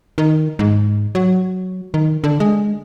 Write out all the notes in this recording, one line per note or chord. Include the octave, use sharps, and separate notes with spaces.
D#3
G#2
F#3
D#3
D3
G#3